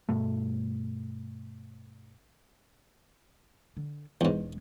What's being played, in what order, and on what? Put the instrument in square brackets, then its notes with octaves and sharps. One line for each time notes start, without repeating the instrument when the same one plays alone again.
[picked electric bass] G2 B2 A3
[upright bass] D3
[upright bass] E1 G#3 [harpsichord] E2 G#2